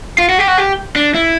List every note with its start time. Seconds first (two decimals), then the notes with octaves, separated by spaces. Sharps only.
0.18 F4
0.29 F#4
0.39 G4
0.48 F#4
0.58 G4
0.96 D4
1.15 E4